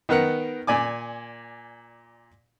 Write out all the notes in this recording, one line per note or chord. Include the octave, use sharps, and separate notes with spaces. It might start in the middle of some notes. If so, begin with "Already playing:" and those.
D#3 B3 A#4 F#5
A#2 D5 G#5 D6